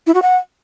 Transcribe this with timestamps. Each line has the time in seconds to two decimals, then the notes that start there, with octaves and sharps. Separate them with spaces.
0.07 E4
0.14 F#4
0.22 F#5